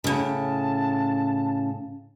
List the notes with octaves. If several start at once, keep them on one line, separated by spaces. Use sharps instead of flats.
A2 C#3 A5